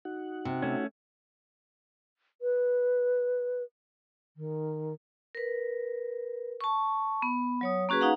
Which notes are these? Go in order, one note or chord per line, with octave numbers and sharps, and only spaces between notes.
D#4 F#4 F#5
C3
A3 C#4
B4
D#3
A#4 B4
A5 C#6
B3
F#3 C#5 D#6
A#3 C#4 F#4 G#4 B4
D#4 F5 F#5 A#5